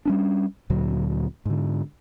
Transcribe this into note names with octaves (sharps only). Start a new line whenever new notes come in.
G3 C#4 D4
D2 A#2 D3 F#3
G#2 D3